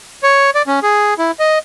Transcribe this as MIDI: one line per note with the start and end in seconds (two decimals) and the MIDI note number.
0.23 0.50 73
0.55 0.62 74
0.67 0.80 61
0.83 1.14 68
1.18 1.31 64
1.40 1.59 75